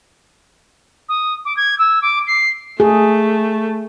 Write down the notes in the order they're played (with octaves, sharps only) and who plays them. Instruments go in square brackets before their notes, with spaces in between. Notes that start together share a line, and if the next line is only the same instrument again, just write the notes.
[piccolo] D#6
D6
G#6
E6
D6
C7
[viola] A3 [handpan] G#4